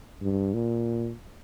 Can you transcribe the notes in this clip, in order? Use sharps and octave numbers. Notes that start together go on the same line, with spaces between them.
G2
A#2